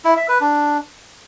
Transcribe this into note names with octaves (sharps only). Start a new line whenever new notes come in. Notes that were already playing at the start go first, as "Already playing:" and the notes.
E4
E5
B4
D4